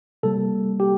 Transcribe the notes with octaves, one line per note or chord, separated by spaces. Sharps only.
C3 G3 A#3 A4
G4